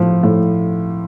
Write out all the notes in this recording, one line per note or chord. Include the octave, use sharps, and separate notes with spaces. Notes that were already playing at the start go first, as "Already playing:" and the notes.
Already playing: A2 F3
A2